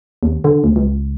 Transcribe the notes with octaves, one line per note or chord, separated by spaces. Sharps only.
D#2
D3
D2
C#2